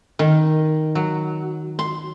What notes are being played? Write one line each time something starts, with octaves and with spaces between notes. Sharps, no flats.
D#3
F#3
C6